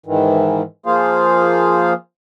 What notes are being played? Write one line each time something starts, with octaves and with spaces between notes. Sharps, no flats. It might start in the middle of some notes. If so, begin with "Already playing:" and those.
G#2 D#3 E3
F3 A#3 F4 G#4 C5 F5